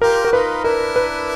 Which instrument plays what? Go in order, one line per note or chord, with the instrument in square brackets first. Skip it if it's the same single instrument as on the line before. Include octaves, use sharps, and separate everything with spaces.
[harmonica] F4 G4 [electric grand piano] A#4
[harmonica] F#4 [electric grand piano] A#4
[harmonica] D#4 F4 [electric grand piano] B4
[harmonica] D4 E4 [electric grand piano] A#4
[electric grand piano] B4